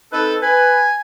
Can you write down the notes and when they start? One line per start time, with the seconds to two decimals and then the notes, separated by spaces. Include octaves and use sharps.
0.13 C4 D#4 A4 B4
0.43 B4 G#5